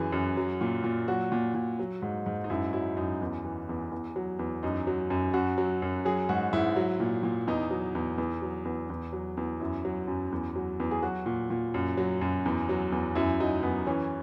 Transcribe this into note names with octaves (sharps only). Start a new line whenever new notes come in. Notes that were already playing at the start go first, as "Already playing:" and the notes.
Already playing: F#2 E3 G#4
F#2
F#3
A#2
A#2
F#3 F#4
A#2
A#2
F#3
G#2
G#2
D#4
F#2 E4
F#3 E4
F#2 D#4
E2
E3
E2
E2
F#3
E2
F#2 D#4
F#3
F#2
F#2 F#4
F#3
F#2
F#3 G#4
G#2 F#4
G#2 E4
F#3
A#2
A#2
E2 D#4
F#3
E2
E2
F#3
E2
E2
F#3
E2
F#2 E4
F#3
F#2
E2
F#3
E2
G#4
F#3 F#4
A#2
A#2
F#2
F#3
F#2
E2
F#3
E2
F#2 E4
F#3 D#4
F#2 B3
E3 C#4